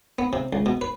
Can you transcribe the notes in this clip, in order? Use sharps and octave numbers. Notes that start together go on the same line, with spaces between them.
B3
C3
C#2
B2
B4